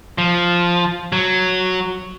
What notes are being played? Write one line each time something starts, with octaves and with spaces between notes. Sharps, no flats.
F3
F#3